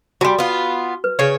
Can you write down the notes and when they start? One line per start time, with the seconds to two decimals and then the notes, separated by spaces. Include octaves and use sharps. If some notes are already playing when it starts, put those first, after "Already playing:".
0.21 F#3 G3 F#4 G#5 C6
0.39 B3 F4
1.04 B4
1.19 C#3 C#5